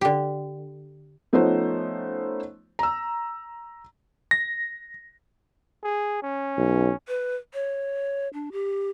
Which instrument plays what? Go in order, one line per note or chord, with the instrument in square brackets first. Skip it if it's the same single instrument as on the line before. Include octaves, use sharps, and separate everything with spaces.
[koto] D3 G4
[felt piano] F3 A3 B3 C#4 D#4 C5
A#5 E6
[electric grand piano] A#6
[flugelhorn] G#4
C#4
[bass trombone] B1
[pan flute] B4
C#5
D4
G4